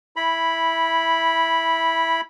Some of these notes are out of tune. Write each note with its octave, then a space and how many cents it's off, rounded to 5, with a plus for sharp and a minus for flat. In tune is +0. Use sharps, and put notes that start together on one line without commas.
E4 +0 B5 -10